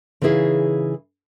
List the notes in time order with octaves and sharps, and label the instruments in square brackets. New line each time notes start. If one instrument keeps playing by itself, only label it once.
[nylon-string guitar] C#3 E3 D#4 E4 G#4 F5